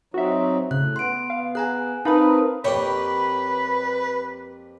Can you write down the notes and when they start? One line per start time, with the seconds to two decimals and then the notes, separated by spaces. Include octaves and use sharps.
0.14 F#3 C4 D#4 F#4 E5
0.71 A2 C#3 F#6
0.96 B3 C6 D7
1.30 F5
1.55 G#4 G#5 A#5 F#6
2.05 C4 D#4 A#4 B4 F5 A5 B5 D#6
2.64 F2 A#3 G4 B4 C#5 G5 B5